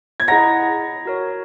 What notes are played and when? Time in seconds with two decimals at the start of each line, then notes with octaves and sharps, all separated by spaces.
0.20 G#6
0.28 E4 G#4 D#5 F#5 A#5 A#6
1.05 F#4 A#4 C#5